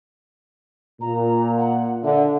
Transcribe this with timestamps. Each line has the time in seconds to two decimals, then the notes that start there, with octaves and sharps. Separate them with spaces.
1.01 A#2 A#5
1.58 F#5
2.04 D3 E5